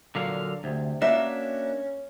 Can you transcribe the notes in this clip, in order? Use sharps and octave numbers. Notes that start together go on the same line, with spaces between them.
A#2 D3 F#3 F5
D2 C3
A#3 C#4 D4 F#4 E5